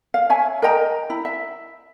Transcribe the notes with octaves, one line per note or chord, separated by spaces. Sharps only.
F5
C#5 E5 G#5
A#4 D#5 G5 A#5
E4
E5